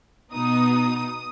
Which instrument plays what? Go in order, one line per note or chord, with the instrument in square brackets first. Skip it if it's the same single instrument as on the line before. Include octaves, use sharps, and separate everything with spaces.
[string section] B2 B3 D#4 D#6